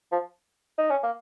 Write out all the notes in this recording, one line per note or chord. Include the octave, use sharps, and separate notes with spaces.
F3
D#4
C#4
A#3